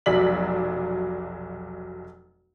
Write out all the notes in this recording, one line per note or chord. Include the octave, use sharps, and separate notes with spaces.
F1 B1 F#3 D5 B6 F#7